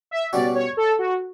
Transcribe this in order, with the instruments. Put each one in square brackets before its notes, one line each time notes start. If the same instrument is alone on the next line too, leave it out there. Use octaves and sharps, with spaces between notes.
[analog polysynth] E5
[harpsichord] B2 G3 C#4 F#4 [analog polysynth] D5
[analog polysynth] C#5
A4
F#4